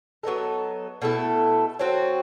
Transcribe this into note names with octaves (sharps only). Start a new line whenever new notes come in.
F#3 B3 D#4 A4
B2 A3 E4 A4
F#3 C4 F#4